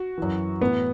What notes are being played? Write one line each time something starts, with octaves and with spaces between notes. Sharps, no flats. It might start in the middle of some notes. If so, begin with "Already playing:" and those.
Already playing: F#4
F#2 E3
A2 E3 B3